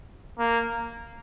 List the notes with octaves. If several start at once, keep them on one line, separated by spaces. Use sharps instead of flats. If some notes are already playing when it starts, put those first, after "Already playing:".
A#3